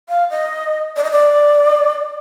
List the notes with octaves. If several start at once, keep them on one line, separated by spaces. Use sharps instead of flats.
F5
D#5
D5
D#5
D5